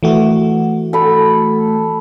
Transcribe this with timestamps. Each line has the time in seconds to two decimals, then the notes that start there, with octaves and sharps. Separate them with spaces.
0.03 E3 A3 F#4
0.93 A4 B5